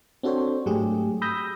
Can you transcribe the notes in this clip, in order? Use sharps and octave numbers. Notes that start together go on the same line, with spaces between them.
C4 D4 F#4 A4 C5 C#5
G#2 F#3 A3 G4 G#4
B5 D#6 E6 G6 A#6